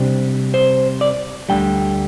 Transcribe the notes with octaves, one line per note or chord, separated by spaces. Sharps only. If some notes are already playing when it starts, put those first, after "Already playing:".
Already playing: C3 G3 D4 C5
C5
D5
D2 D3 G3 G5